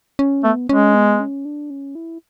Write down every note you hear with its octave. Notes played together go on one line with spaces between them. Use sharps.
C#4
A3 B3
G#3 C#4
B3
C#4
D4
C#4
E4